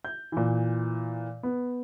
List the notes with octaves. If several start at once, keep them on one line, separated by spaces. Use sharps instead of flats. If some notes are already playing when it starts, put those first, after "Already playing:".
G6
A#2 E3
B3